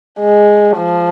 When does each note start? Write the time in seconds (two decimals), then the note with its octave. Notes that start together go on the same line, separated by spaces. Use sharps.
0.19 G#3
0.77 F3